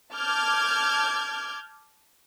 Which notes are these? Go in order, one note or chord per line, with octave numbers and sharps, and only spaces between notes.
A5 D6 F6 G6 G#6